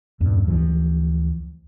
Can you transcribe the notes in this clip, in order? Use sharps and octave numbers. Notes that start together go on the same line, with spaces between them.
E2 G2 A#2
D2 E3 F3